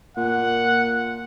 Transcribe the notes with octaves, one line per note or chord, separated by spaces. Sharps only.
A#2 F#5